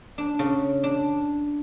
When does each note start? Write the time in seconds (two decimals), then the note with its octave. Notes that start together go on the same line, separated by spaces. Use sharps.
0.18 D4
0.39 C#3
0.83 D4